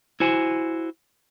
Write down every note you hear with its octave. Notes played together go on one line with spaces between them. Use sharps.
E4 F#4 C5 G#5